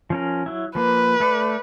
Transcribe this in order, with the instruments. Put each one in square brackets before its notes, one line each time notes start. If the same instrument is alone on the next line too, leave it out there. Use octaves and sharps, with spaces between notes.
[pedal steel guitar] F3 C#4 A#4
F#3 E4
[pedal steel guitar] F3 A#3 [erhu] B4
[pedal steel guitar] A3 A4 D5